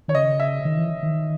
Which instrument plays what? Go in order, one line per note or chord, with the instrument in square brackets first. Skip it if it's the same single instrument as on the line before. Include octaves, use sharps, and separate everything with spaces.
[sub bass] D#3 [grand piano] C#5
[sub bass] C#3 [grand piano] D#5
[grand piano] E5
[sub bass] D#3
E3
D#3